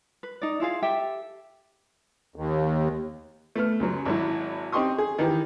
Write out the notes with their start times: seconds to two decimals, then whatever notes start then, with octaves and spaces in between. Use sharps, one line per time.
0.23 B4
0.42 D#4 D5
0.60 E4 F4 G#4 F5
0.82 G4 A4 E5 G5
2.36 D#2
3.55 A3 B3 F6
3.80 C#2 F#2 F#3
4.05 G#1 F#3 E4
4.72 C4 D#4 G4 C6 C#6 D#6
4.98 G#4
5.19 D#3 E3 G4